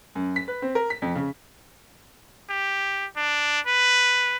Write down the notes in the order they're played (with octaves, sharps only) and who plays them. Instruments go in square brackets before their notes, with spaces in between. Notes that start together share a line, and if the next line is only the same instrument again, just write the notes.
[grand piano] F#2
B6
B4
C4
A#4
B6
F2
C#3
[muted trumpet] G4
D4
B4